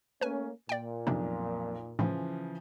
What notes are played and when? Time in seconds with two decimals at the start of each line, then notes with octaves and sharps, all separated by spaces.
0.21 A3 A#3 C#4 B4 G#5
0.69 A#2 D5 G5
1.07 B1 F2 C3 D4
1.99 A2 C#3 E3 F3